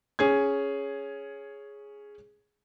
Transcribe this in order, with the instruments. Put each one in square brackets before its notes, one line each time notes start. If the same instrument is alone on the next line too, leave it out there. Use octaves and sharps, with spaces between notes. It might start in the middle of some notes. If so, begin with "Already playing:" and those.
[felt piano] C#4 G#4 G#6